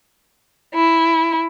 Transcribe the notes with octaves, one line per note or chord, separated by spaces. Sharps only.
E4